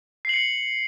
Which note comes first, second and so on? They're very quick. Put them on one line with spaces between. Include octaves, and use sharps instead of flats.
C7 F#7 C#7